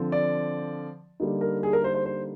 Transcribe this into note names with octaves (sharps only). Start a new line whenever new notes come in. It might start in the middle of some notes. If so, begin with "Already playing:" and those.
Already playing: D3 F3 C4
D5
D3 G3 A#3 D#4
A#4
G#4
A#4
C5
C5
C5